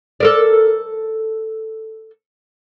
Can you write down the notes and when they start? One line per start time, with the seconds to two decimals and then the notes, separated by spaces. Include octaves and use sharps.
0.20 A4 A#4 D5